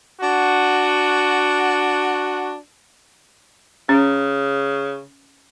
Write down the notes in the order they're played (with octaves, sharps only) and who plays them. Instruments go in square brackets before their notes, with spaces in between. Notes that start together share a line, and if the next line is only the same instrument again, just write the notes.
[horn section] D4 F#4
[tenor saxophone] C#3 [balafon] C#4